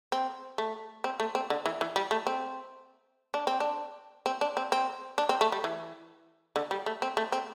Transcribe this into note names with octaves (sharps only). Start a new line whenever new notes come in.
C4
A3
C4
A3
C4
D3
E3
E3
G3
A3
C4
D4
C4
D4
C4
D4
C4
C4
D4
C4
A3
G3
E3
D3
G3
A3
C4
A3
C4